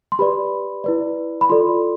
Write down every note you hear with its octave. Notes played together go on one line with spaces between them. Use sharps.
C6
G4 B4 D5 B5
E4 B4 D5
B5
F4 A4 D5 C6